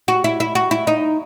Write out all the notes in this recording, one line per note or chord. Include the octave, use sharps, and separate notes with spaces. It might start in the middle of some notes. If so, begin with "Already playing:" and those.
F#4
E4
E4
F#4
E4
D#4